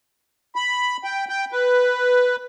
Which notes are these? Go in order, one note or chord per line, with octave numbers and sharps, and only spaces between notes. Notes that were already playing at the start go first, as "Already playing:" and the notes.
B5
G5
G5
B4